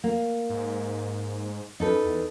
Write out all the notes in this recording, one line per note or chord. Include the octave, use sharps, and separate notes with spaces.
A#3
G#2
F#2 D#4 A4 B4
E2